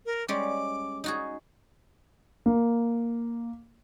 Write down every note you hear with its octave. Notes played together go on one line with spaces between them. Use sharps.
A#4
G3 G#3 C#4 D6
D#4 F#4 G#4
A#3